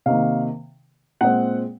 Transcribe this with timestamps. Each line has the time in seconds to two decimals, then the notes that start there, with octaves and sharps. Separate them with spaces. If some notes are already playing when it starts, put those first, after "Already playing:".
0.06 C3 D#3 A#3 F5
1.21 A#2 G#3 C4 F#5